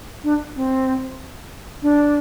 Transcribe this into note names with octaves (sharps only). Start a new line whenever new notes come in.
D4
C4
D4